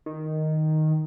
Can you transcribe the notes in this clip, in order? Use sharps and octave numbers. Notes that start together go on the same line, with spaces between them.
D#3